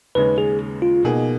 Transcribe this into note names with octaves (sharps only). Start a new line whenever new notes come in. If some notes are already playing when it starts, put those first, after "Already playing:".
D#2 C#3 G#3 C#4 B4
G#4
F4
B2 A#3 D#4 G#4